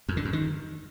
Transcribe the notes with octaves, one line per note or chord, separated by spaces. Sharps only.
F2
D3
F#2
D#3